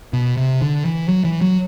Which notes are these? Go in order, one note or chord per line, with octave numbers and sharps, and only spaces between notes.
B2
C3
D3
E3
F#3
E3
F#3